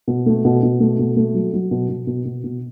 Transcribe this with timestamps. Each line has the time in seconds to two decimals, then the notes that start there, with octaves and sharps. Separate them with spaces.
0.07 B2
0.26 A3
0.45 B2
0.63 B2
0.80 A3
0.99 B2
1.17 A3
1.34 F#3
1.53 F#3
1.71 B2
1.89 B2
2.07 B2
2.25 B2
2.44 B2